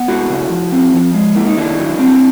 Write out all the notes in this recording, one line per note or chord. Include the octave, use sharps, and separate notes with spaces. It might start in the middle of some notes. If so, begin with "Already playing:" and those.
Already playing: B3
A3 E4 F#4
C#3
F3
C4
F3
G#3
A#3 E4
D#4
D#3 D4 E4
F#3
C4